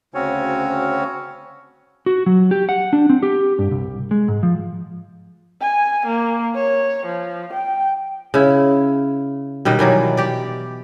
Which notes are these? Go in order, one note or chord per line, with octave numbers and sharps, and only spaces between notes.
D2 C#3 C4 C#4 F#4 C#5
F#4
F#3
G4
F#5
D4
C4
G4
G2
C2
G#3
G#2
F3
G#5
A#3
C#5
F3
G5
C#3 E4
B2 D#3 G3 D#5
D#3 E3 F#3 D5
G4 D5